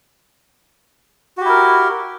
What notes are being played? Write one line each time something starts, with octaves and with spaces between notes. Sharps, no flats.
E4 F#4 G4 A#4